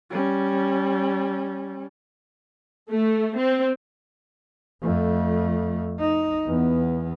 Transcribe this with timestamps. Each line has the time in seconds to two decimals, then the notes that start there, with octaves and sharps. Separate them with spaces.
0.10 G3 C#4
2.91 A3
3.39 C4
4.83 F2 A3
5.99 D#4
6.46 E2 B3